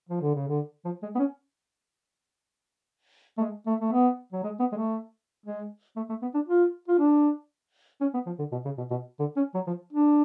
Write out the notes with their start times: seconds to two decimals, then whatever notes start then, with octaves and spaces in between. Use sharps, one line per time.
0.09 F3
0.22 D3
0.35 C#3
0.48 D3
0.85 F3
1.03 G#3
1.15 B3
1.19 C#4
3.38 A3
3.41 G#3
3.67 A3
3.81 A3
3.92 B3
4.33 F#3
4.44 G#3
4.60 B3
4.72 G#3
4.77 A3
5.46 G#3
5.97 A3
6.09 A3
6.22 B3
6.34 D4
6.48 F4
6.88 F4
6.98 D4
8.01 C#4
8.14 B3
8.27 F3
8.39 D3
8.52 B2
8.65 C#3
8.78 B2
8.91 B2
9.20 D3
9.37 C#4
9.55 F#3
9.67 F3
9.93 D4